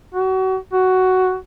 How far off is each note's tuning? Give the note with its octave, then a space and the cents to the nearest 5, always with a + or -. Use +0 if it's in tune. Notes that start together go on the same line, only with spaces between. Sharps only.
F#4 +30
F#4 +10